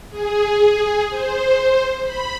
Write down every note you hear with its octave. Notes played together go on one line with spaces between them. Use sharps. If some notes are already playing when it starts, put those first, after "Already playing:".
G#4
C5
B5